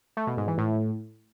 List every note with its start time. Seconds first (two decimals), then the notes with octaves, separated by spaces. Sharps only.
0.17 A3
0.27 B2
0.37 G#2
0.48 E3
0.58 A2